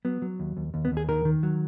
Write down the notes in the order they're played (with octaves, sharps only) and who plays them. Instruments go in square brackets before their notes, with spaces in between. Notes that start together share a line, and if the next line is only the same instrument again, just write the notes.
[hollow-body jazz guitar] F#3 B3
F#3
D#2
D#2
D#2
B3
D#2
G#4
D#3 A#4
D#3
F#3